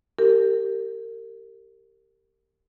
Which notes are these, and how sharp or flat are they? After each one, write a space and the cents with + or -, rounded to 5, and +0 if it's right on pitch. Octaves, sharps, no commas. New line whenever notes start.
G4 -5 A#4 -30